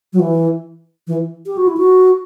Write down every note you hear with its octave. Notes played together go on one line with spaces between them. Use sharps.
F#3
E3
E3
G4
F#4
E4
F#4